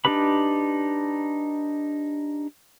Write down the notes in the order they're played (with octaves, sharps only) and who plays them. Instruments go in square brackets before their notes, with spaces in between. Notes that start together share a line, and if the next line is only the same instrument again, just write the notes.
[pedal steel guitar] D4 D#4 G4 B4 B5